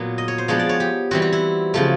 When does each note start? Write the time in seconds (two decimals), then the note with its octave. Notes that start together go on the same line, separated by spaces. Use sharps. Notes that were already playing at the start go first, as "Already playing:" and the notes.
Already playing: A#2 F#3 B3
0.18 D#5
0.28 C#5
0.38 C5
0.48 F3 G#3 B3 D4 C#5
0.59 D5
0.69 C#5
0.80 G4
1.11 E3 G3 C4 F#4
1.22 F#4
1.33 E4
1.74 C#3 F3 A3